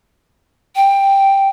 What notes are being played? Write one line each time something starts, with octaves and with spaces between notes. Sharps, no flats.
G5